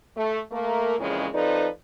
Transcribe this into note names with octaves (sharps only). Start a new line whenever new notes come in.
A3
A3 A#3 A#4
F2 A#2 C#3 E3 G#3 C#4
F3 C4 D#4 A4 B4 D5